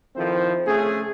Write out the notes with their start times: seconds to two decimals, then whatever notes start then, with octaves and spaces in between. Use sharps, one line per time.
0.15 D#3 F3 C4 E4 A4 C5
0.66 C#3 A3 C4 C#4 G#4